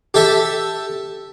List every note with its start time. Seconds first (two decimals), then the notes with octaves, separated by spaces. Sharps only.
0.14 G4 A4 E5